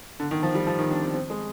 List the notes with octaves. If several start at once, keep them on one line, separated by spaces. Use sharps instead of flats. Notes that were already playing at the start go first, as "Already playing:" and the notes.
D3
D#3
F3
G3
F3
D#3
D4
C4
C4
G#3